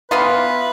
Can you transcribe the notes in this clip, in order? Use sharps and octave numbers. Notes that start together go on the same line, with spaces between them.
E3 B3 F4 B4